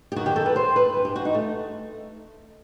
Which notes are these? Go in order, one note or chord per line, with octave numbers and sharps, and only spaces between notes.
G4
F#2 D#3 F#4
G4
A4
B4
C5
B4
G2 E3
G4
F#4
D#4
A3